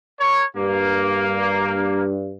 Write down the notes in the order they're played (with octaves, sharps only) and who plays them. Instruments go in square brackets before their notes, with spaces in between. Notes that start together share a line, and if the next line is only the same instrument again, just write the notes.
[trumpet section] A#4 C#5
[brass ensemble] G2 [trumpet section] A#3